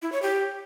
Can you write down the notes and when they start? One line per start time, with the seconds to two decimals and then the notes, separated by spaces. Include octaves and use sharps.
0.02 E4
0.12 C#5
0.22 G4